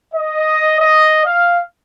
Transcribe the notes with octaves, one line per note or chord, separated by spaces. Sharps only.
D#5
D#5
F5